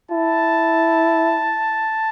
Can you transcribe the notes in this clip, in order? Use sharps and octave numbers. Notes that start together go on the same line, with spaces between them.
E4 A5